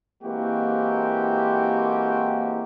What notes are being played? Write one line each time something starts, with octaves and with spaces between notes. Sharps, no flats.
E3 G#3 A#3 C4 F#4 G4